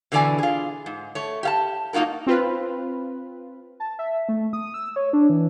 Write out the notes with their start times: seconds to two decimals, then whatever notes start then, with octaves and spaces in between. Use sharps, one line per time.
0.12 B2 D3 E3 C4 D5 G#5
0.39 F4 G#4
0.86 G#2
1.15 A3 C#5
1.43 G4 F5 A5
1.93 A#3 D#4 F4 F#4 A#4
2.27 C4 F4 B4
3.80 A5
3.99 E5
4.29 A3
4.53 D#6
4.74 E6
4.96 C#5
5.13 D4
5.30 E3